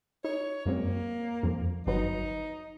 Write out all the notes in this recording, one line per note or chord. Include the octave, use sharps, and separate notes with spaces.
D#4 C#5
F#2 G#3 A#3 C4
F2 F3
G1 F#3 D#4 B4